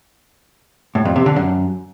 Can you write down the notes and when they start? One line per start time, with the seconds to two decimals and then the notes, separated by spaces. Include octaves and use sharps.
0.95 A2
1.05 F2
1.16 C3
1.26 D3
1.36 F#2